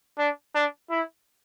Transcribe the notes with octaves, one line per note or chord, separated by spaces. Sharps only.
D4
D4
E4